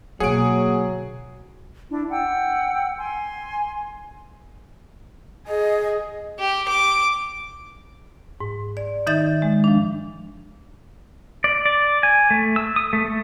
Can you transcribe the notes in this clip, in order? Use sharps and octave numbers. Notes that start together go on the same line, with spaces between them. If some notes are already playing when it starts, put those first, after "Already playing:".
B2 D3 F#3 A#3 G#4 C#5 F#5 D7
D4 E4
F#5 G5 E6
G#5 C6
G#4 D#5
G4
D6
G#2
D5
D#3 D#4 E5 G6 A6
G#3
F3 D4
D5
D5
G#5
A3
E6
D#6
A3
A3